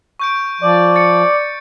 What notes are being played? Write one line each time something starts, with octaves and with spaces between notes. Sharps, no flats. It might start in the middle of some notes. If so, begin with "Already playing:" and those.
C#6 G6 D7
F3 D5
A6 C#7